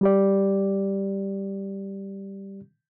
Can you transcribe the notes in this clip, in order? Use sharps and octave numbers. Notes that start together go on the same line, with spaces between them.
G3 G4 D5